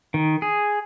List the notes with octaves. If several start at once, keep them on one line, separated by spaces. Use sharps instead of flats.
D#3
G#4